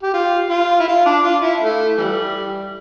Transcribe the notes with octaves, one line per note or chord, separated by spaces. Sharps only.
G4
F4
F4
E4
F4
D4
F4
E4
A3
E3 G3